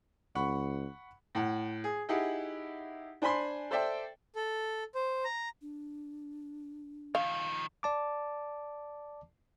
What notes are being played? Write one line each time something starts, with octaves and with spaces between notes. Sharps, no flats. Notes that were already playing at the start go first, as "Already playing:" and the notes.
C#2 F#5 B5 C#6
A2 F#5
G#4
D#4 E4 G4 G#4 F#5
D4 C5 G#5 B5 C6
A4 C5 D5 E5 G5
A4
C5
A#5
D4
D#3 F3 F5
D5 A5 D6